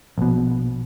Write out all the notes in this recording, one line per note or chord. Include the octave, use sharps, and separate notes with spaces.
A#1 B2